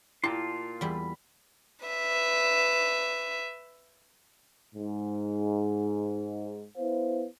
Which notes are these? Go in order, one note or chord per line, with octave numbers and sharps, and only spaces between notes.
A#2 E4 F4 G4 A5 C6
E2 G3 B5
B4 E5
G#2
B3 E4 B4 C5 F5